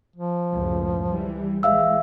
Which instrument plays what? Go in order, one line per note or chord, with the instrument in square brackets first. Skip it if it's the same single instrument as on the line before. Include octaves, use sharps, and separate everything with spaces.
[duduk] F3
[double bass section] C#2 F#2 A2
E3 G3
[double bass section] A#1 E3 G#3 [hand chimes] E5 F5 E6